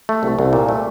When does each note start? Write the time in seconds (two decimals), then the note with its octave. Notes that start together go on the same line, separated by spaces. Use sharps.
0.09 A3
0.23 C2
0.39 C2
0.53 A#2
0.69 A3